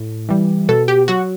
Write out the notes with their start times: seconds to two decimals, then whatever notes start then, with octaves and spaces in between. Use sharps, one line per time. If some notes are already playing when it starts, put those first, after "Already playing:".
Already playing: A2
0.29 E3 G3
0.69 B2 A4
0.88 G4
1.08 F#3 F#4